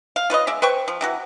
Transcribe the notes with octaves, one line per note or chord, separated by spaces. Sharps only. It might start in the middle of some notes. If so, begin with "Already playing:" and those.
F5
F4 B4 C#5 D#5
G#3 D5 E5
B4 C5 G5 C#6
F3
C3 E3 F#4